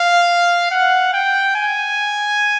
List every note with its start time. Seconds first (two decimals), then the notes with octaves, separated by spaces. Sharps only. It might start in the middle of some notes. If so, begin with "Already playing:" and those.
Already playing: F5
0.71 F#5
1.14 G5
1.56 G#5